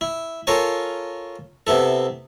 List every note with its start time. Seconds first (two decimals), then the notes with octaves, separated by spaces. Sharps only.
0.01 E4
0.47 F4 A4 A#4 C#5 G#5
1.67 C3 B3 E4 A4